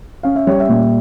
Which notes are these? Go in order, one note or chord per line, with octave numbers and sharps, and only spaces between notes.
C#4 F5
E5
G3 C#5
E5
A#2